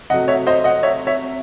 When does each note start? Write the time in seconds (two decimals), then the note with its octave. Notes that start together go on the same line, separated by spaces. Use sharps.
0.10 C3 F#3 A3 D#5 F#5
0.28 C#5 E5
0.47 C5 D#5
0.64 D#5 F#5
0.83 C#5 E5
1.07 C#5 E5